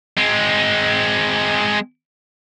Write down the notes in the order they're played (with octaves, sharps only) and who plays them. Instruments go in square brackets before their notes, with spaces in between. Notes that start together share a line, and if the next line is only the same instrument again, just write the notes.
[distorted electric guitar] G#3 C4